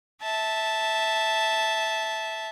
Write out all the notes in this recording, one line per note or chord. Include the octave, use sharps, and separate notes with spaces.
E5 A5